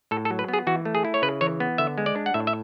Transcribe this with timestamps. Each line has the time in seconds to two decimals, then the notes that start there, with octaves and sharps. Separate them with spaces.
0.11 A2 A4
0.25 A4
0.30 F#3
0.39 B4
0.49 B3 G#4
0.67 E3 F#4
0.85 A3
0.95 G#4
1.05 E4
1.14 C#5
1.22 C#3 B4
1.41 E3 C#5
1.60 B3
1.78 D3 E5
1.98 G#3
2.06 D5
2.16 D4
2.26 F#5
2.34 A2 E5
2.47 E5